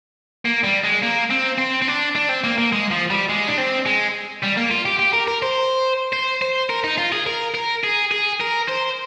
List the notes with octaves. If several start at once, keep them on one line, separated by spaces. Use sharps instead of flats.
A#3
G3
G#3
A#3
C4
C4
C4
D4
D4
C4
A#3
A#3
G#3
F3
G3
G#3
D4
C4
G#3
G3
A#3
F4
G4
G4
A#4
A#4
C5
C5
C5
A#4
D#4
F4
G#4
A#4
A#4
G#4
G#4
A#4
C5